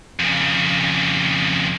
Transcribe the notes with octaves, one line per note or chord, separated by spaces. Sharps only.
F2 C#3